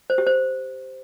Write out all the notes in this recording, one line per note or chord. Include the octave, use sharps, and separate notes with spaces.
C5
G4
C5